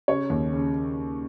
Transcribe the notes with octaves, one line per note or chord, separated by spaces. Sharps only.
C#3 C#5
D#2
C#3